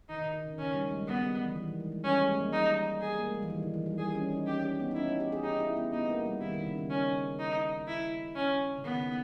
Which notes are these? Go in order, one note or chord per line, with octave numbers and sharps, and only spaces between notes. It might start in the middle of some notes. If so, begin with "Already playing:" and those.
D#3 D#4
D#3
D#3
C#3
D#3 C#4
G3
G#3
G3 B3
E3
D#3
E3
G#3
G#3
G3 C#4
G#3
G#3
A#3
G3 D#4
G#4
A#3
G#3
G3
E3
D#3
D#3
E3
G3
G3 G#4
C#4
D#4
C#4 G4
C#4
B3
D#4
C#4 E4
D#4
G4
G#4
D#4 G4
E4
B3
B3 D#4
A#3
G3
D#3 E4
D#3
C#3
D#3
C#4
D#4
E4
C#4
C#3
D#3 B3